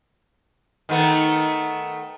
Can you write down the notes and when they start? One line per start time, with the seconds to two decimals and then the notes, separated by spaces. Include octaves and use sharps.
0.89 D#3 A3 B3